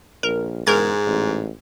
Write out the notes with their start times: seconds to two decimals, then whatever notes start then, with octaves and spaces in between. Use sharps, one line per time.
0.23 A#1 A#4
0.67 E1 G#2 G#3 A#4 G#6
1.06 A1